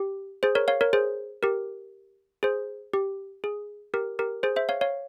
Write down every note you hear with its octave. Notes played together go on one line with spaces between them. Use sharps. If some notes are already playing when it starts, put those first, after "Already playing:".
Already playing: G4
G#4 C5
A#4 C#5
C#5 F5
A#4 C#5
G#4 C5
G4 A#4
G#4 C5
G4
G#4
G4 A#4
G4 A#4
G#4 C5
C5 E5
C#5 F5
C#5 F5